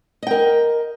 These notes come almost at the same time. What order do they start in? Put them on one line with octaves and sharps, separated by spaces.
D#5 G5 A#4